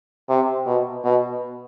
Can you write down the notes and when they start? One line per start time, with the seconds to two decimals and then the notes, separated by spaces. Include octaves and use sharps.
0.29 C3
0.66 B2
1.04 B2